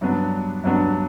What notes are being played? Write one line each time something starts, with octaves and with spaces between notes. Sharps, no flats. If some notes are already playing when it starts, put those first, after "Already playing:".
G2 F#3 B3 D4
G2 F#3 B3 D4